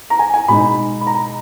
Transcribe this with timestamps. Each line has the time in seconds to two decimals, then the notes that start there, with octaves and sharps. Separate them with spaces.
0.10 A#5
0.19 G#5
0.34 G#5
0.48 B2 G#3 D#4 B5
1.01 B5
1.07 A#5